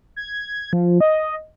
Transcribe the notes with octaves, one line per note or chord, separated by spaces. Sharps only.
G#6
F3
D#5